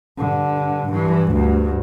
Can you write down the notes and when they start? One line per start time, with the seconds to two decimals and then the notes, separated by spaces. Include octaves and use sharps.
0.18 G2 D3
0.89 G2 E3
1.32 D2 G2